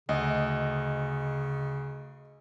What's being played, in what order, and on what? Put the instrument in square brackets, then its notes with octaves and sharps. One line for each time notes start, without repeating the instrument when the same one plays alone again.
[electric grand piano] D2 [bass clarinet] C#3 [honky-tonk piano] D#5